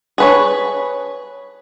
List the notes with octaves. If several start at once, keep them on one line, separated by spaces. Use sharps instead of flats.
G#4 B4 C#5